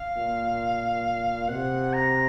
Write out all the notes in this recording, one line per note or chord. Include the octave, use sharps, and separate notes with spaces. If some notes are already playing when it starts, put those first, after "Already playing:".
Already playing: F5
A#2
C3 F#5
A#5